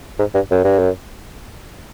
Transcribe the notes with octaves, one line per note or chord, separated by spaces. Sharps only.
G#2
G2
F#2
G2
F#2